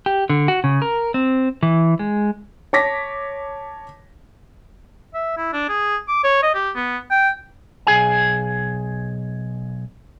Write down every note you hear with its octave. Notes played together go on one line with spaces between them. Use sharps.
G4
D3
F#4
C#3
A#4
C4
E3
G#3
C#5 A5 D6 A#6 B6
E5
E4
D4
G#4
D6
C#5
D#5
G4
B3
G5
B1 G#4 G#5